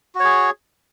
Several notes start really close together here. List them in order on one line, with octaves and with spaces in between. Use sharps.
F#4 C#5 G#4